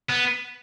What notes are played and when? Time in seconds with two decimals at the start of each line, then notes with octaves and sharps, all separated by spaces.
0.09 B3